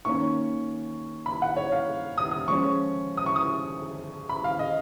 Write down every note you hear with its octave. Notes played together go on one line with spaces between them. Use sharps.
D#3 A#3 C#4 C#6
B5
F#5
C#5
F5
D#6
D#6
F3 G#3 C#4 C#6
D#6
C#6
D#6
B5
F5
D#5